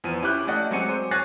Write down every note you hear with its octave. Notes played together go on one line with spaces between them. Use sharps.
E2 F3 D#7
C#4 E4 G4 D6 F#6 G6
A3 C#4 D5 D#5 F#5
F#3 G#3 C4 G#5 C#7 D#7
C5
C#5 G#5 F#6 A6 A#6 C7